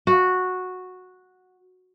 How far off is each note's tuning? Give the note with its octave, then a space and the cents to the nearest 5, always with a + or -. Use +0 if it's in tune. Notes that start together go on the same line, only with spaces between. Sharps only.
F#4 -10